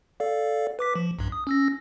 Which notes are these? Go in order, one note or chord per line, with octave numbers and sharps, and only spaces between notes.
A4 D5 F5
B4 D6 B6
F3
B1 G2
D#6
C#4 E6 A#6